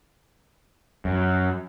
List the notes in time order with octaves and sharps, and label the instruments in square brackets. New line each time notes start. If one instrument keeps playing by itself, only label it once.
[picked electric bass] F#2